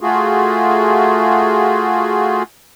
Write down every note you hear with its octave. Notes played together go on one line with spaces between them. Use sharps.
A3 F4 F#4 G#4